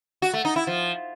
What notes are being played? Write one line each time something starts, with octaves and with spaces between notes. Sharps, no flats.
F#4
A3
D#4
E4
F3